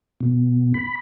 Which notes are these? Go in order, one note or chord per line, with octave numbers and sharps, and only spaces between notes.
B2
B5